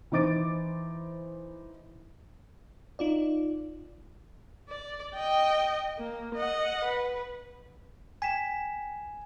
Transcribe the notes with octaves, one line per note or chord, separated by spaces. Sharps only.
E3 D#4 C5 D6 A6 D7
D#4 F4 D5
D5
D#5 G5
A#3
D#5 F#5
B4
G5 G#5 B6 E7